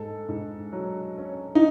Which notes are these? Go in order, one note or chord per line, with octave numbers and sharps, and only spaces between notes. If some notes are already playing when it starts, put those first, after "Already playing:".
Already playing: G#2 A4
G#2
F#3
C#4
D#4